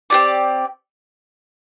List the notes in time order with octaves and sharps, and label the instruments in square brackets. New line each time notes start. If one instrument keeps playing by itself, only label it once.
[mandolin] C4 G4 D5